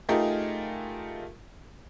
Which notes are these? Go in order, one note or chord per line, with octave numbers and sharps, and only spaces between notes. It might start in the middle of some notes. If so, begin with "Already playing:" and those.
A3 D#4 F4 G4 G#4 A#4